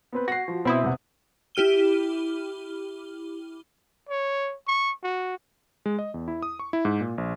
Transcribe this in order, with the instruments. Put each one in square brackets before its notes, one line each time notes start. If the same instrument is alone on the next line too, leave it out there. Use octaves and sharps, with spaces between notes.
[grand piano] B3 C4 B4
[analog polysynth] F#4 [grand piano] A#6 C7
[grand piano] F3
[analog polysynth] B2 E4 [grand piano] C4 D#6
[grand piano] E2 C3 F#5
[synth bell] E4 G4 F6 D#7 G7
[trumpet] C#5
C#6
F#4
[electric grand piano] G#3
D#5
E2
E4
D#6
C#6
E4
G#2
A#2
A#1